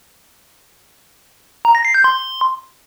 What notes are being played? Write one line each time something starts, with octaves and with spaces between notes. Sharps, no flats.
A#5
A#6
C7
G6
C6